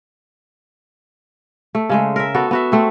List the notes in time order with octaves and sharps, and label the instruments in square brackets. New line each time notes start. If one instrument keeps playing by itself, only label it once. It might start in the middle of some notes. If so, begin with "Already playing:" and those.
[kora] A3
C#3 G#3 A3
A#4 E5
B3 F#4 A4
B3 F#4 E5
A3 C4